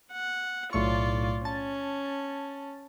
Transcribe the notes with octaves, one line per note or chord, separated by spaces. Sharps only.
F#5
B1 A2 F4 D5 C#6
C#4 A5